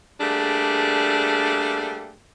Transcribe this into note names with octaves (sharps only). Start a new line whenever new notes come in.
G3 A3 A#3 D4 G#4